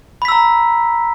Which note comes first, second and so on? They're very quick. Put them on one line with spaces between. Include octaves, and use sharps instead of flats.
B5 B6 E6 A#5